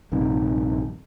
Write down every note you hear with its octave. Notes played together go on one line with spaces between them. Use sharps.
A#1 G2 C3 D#3